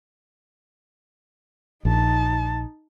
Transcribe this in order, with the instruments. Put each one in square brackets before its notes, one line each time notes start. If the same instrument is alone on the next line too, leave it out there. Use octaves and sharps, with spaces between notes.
[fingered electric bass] A#1 [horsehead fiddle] D#4 A5